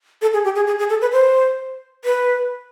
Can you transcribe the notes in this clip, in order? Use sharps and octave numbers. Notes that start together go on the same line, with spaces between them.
A4
G#4
G4
G#4
G#4
G#4
A4
B4
C5
B4